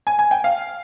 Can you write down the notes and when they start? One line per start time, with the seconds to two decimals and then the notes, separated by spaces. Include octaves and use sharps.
0.07 G#5
0.19 G#5
0.31 G5
0.44 F5